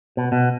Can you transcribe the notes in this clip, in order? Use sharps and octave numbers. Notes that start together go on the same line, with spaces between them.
B2
B2